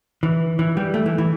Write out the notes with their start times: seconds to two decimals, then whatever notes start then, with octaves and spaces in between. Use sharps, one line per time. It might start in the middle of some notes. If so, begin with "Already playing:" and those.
0.23 E3
0.59 E3
0.77 G3
0.94 A3
1.06 E3
1.18 E3